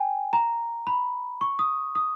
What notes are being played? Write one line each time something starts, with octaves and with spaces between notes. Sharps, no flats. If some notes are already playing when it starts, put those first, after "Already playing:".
Already playing: G5 G#5
A#5
B5
C#6
D#6
D#6